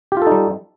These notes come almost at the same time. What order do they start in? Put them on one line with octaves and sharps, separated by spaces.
G4 F4 A4 D#4 G3